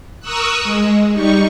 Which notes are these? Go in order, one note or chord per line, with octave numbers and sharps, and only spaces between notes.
A#4 C#6 D#6 E6 F#6
G#3
G3 D#4 C#6